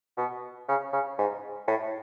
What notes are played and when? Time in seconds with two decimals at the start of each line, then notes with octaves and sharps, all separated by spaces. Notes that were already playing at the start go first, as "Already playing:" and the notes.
0.17 B2
0.68 C#3
0.93 C#3
1.18 G#2
1.68 A2